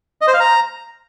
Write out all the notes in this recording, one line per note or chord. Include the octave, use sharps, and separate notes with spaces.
D#5
C5
F5
A#5